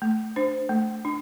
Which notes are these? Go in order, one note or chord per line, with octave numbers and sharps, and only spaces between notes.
A3
D4 C5
A3
D4